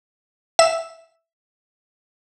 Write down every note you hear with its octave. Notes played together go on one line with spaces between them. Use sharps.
E5 E7